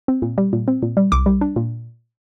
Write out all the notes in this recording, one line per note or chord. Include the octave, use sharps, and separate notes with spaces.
C4
A#2
G3
A#2
C4
A#2
G3
C2 D6
G3
D4
A#2